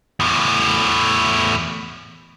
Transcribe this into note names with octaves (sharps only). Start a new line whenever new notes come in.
E2 A2